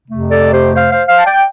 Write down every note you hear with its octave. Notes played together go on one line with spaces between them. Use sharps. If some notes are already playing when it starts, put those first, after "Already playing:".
F2 C3 A3
A4 D5
G4 C5
C5 F5
C5 F5
C5 F5
A5
D5 G5